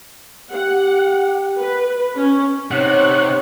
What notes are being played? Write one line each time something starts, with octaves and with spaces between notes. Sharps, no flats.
G4 F#5
B4
C#4
C3 D#4 C5 C#5 F#5